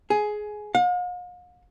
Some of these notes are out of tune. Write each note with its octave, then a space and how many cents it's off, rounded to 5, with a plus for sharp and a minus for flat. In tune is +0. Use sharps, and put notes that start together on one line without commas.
G#4 +15
F5 +45